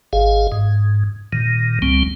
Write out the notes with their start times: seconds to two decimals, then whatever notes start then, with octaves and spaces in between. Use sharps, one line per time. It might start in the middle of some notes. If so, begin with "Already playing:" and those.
0.13 G#1 G#4 F5
0.52 G#2
1.33 A#2 D#3
1.82 C#2 G3 C4